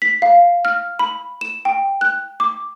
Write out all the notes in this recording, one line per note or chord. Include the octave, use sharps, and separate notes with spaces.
B6
F5
F6
B5
E7
G5
F#6
D6